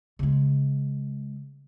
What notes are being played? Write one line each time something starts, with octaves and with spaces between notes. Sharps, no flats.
C#3 G#3